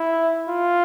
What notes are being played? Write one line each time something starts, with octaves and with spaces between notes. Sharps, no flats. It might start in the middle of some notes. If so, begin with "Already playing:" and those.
Already playing: E4
F4